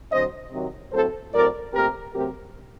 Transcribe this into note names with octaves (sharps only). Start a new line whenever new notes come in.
D3 F#3 C4 C5 D#5
C3 D#3 F#3
A2 F#3 A3 C4 A4 C5
A2 F#3 A3 C4 A#4 D5
A#2 A3 C4 G4 A#4
C3 F#3 A3 C4 G4 A#4